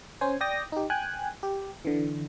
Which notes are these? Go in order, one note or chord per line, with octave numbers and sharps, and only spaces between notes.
C#4 C5 G#5
D5 G5 D#6 A#6
D#4 G4
G5 G#5 F#6
G4
D3 E3